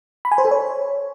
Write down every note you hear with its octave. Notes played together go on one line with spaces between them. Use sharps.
B5
G#5
C5
A4
C#5